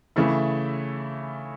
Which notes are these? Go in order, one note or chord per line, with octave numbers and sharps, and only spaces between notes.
C#3 E3 A3 E4